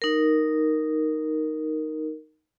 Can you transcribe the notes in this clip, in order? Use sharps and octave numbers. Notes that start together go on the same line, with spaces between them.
D#4 A#4